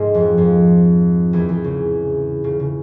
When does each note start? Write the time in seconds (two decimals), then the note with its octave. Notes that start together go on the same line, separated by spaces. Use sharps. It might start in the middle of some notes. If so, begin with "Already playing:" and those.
Already playing: G#2 G#3
0.14 F2 F3
0.38 F2 F3
1.33 E2 E3
1.49 E2 E3
1.64 C#3
2.44 C#3
2.60 C#3